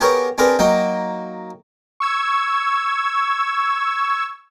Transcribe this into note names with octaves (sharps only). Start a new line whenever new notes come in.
B3 G4 G#4 A#4 C#5
C4 D4 G#4 A#4 B4
F#3 A#3 D#4 G5
C#6 E6 G#6